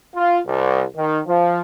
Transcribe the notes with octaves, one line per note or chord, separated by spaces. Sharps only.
F4
C2
D#3
F3